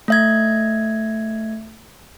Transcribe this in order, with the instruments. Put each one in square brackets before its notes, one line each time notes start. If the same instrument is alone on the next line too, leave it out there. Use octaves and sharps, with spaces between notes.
[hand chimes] A3 E5 G#6